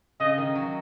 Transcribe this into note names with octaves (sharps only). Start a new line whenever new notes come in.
C#3 D#5
D#3
F#3